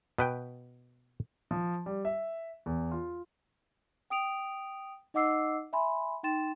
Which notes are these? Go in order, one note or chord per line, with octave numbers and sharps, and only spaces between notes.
B2 B4 G5
F3
G3
E5
E2
F4
G5 D#6 D7 F7
D#4 D#5 F#5 D6 E6 C7
E5 G#5 B5 C6
D#4 G5 C6 A6 E7